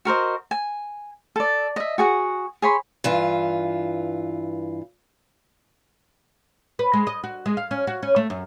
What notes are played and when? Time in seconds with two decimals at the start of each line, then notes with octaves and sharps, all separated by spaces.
0.05 F#4 A#4 C5 D#5
0.51 G#5
1.36 A4 D5
1.76 D#5 E5
1.98 F#4 G#4 F#5
2.62 G#4 C#5 B5 C6
3.04 G2 E3 F4
6.79 B4
6.93 G#3
7.07 D#5
7.24 F#4
7.46 G#3
7.57 F5
7.71 C#4
7.87 F#4
8.03 C#4
8.16 A3
8.30 F#2